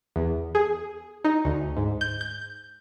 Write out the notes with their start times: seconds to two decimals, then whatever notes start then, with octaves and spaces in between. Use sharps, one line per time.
0.16 E2
0.55 G#4
1.25 D#4
1.45 D2
1.77 G#2
2.01 G6
2.21 G6